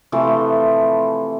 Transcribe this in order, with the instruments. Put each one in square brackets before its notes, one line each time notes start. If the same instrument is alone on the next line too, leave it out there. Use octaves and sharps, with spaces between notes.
[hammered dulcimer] C3 E3 F3 A3